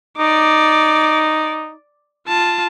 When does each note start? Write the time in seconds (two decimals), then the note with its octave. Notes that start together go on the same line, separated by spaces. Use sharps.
0.18 D#4 D5 D6
2.28 F4 A5